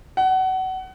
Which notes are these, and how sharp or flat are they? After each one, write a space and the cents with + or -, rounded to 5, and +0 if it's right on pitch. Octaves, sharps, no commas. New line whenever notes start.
F#5 +25